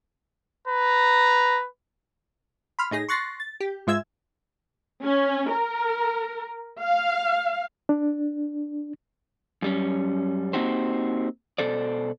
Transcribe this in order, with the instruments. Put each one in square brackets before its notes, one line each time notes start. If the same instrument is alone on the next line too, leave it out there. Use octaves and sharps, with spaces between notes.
[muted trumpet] B4 [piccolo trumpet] A#5
[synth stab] B5 C6 F6
A2 D#4 G#4 A#6
C6 C#6 F#6 A6 A#6 C7
A6
G4
G#2 G#3 F4 E5 E6 G#6
[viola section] C#4
A#4
F5
[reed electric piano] D4
[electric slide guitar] F#2 G3 C#4
A#3 C4 D#4 F#4 G4 C5
B2 A4 C5 D5